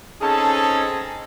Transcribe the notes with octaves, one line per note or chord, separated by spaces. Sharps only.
C4 C#4 D#4 G#4 A4 A5